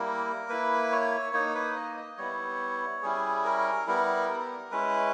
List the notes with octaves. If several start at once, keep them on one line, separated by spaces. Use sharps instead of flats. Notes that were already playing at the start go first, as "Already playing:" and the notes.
Already playing: G3 A#3 E4 A#4
A#3 E4 B4
C#5
A#3 D#4 C#5
B4
D#5
D#5
G3 B3 E4 C#5
G3 C#4 E4 G#4
A#4
G3 B3 E4 A#4
A#4
G#3 C#4 E4 B4